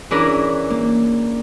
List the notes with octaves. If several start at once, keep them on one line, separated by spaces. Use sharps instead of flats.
E3 C#4 D4 E4 G#4 A#4
A#3